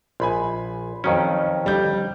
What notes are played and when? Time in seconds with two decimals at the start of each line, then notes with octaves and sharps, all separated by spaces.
0.20 A#1 G#5 B5 C6
1.04 F2 D#3 F#3 C#4
1.64 D3 G3 G6